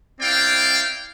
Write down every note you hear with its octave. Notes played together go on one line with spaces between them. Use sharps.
C4 E4 D5 F5 G5